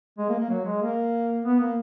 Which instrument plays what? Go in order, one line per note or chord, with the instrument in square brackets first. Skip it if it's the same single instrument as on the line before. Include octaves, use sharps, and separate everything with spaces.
[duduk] G#3
A#3
A#3
F#3
G#3
A#3
B3
A#3